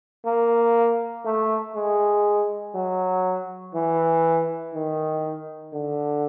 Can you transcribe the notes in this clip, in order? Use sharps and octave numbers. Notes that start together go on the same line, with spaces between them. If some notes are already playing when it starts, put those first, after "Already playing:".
A#3
A3
G#3
F#3
E3
D#3
D3